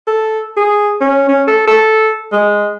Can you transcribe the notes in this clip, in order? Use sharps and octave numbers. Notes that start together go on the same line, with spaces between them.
A4
G#4
C#4
C#4
A4
A4
G#3